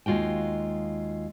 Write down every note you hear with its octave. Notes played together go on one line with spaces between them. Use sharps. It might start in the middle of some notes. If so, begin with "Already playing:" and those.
D#2 G#3 F4 F#4 G5